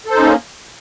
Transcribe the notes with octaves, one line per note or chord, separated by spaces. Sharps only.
A#3 C#4 D#4 A4 C5